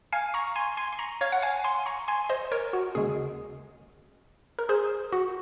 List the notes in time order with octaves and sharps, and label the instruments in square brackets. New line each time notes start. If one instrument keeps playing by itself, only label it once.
[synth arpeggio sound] F5 G#5
A#5 C#6
G#5 C6
G#5 C6
C6
A#5 C#6
C#5 F5
F#5
F5 G#5
G#5 C6
A#5 C#6
G#5 C6
C5 D#5
A#4 C#5
F#4
D#2 C#3 G#3 G#4
A#4
G#4 C5
F#4